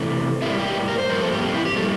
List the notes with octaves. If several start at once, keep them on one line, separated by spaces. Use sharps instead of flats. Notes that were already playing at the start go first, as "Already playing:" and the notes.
Already playing: C3 E3 A3
A2 G3 A#3 E4
G4
A#4
C5
G2 F3 A#3 A#4
A4
G4
A#3
C4
E4
G4
A2 G3 A#3 A4